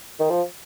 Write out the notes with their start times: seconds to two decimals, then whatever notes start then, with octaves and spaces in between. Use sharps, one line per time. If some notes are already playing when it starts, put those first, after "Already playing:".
0.20 D#3
0.30 F3